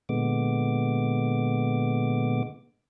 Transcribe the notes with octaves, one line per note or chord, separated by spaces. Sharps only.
A#2 D3 G#3 B3 D6